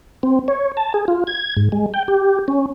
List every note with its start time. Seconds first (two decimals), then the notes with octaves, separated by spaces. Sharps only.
0.23 C4
0.48 C#5
0.77 A5
0.94 G#4
1.08 F4
1.27 G#6
1.57 G#2
1.72 G#3
1.94 G5
2.08 G4
2.48 C#4